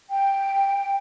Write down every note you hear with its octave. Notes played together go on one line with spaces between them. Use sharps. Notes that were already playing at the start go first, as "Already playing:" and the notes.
G5